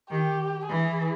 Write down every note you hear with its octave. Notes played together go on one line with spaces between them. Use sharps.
D#3 G4
E3 G#4